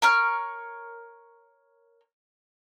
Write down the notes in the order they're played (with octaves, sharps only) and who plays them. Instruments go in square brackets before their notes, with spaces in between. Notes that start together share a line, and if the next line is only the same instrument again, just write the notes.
[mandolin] A#4 C#5 F6